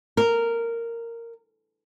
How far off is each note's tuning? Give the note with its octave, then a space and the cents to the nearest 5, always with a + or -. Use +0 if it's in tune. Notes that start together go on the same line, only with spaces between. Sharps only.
A#4 -10